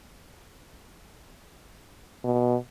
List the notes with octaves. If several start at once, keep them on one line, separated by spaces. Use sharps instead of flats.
B2